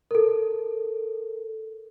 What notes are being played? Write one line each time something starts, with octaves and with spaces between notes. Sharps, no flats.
A4 A#4